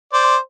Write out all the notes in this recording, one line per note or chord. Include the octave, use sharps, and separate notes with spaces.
C5 D5